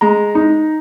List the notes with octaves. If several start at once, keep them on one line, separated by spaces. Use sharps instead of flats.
G#3 A#5
D#4